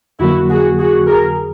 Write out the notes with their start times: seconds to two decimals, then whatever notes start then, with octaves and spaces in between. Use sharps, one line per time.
0.19 F2 D3 F#3 A#3 E4 F#4
0.49 F#4 G#4
0.78 F#4 G#4
1.07 G#4 A#4